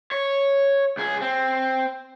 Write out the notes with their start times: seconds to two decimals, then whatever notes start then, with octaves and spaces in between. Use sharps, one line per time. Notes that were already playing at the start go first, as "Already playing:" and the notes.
0.11 C#5
0.97 C#2 G#4
1.21 C4